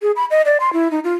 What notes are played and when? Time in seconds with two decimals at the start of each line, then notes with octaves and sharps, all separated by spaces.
0.02 G#4
0.16 B5
0.31 D#5
0.45 D5
0.60 C6
0.73 E4
0.91 D#4
1.04 F4